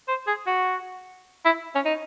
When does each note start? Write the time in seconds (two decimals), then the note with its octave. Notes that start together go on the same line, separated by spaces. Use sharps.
0.08 C5
0.27 G#4
0.47 F#4
1.45 E4
1.75 C#4
1.85 D#4